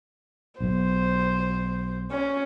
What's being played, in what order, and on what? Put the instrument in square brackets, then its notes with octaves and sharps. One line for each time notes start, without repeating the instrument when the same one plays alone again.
[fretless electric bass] B1 B2 [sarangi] C5
[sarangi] C#4